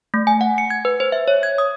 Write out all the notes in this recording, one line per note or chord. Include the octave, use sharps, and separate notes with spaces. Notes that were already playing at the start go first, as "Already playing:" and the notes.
A3
G#5
F#5
C#7
G#6
B4
C5
E5
C#5
G#6
D#6